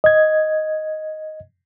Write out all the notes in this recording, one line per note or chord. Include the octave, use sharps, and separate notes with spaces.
D#5 G#6